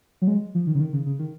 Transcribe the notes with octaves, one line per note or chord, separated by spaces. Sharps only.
F#3
G#3
F3
D#3
C#3
D#3
C#3
C#3
D#3